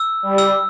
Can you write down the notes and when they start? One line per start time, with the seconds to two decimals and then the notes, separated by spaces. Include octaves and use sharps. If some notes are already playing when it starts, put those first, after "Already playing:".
Already playing: E6
0.23 G3
0.38 E6